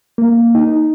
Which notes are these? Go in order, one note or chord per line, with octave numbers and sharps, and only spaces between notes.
A#3
D#4